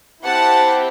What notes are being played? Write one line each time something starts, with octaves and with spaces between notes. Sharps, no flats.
C4 E4 G4 F#5 A5